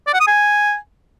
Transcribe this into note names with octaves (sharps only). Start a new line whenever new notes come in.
D5
F#5
D#6
G#5